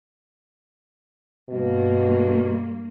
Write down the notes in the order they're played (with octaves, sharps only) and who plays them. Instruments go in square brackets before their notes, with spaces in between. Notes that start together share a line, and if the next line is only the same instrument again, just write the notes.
[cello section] G2 A#3 [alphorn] B2